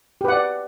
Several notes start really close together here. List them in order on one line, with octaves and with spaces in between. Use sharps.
G4 B4 F#5 D5